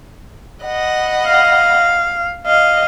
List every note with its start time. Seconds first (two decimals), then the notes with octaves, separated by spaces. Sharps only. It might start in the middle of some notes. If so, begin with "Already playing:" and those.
0.64 D#5 F#5 B5
1.27 F5
2.46 D#5 F5